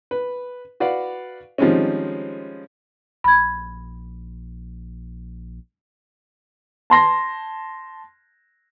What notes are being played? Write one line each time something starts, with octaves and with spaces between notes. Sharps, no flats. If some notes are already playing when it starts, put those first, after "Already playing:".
B4
F#4 B4 D5 F5 F#5
D#3 F3 G3 G#3 C4 C#4
A#1 B5 G#6
A5 C6 A#6